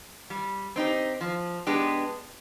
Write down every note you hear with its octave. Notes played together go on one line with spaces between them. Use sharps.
G3
C4 D#4 G4
F3
G#3 B3 D4 G4